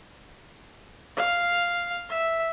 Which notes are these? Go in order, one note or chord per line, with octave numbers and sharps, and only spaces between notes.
F5
E5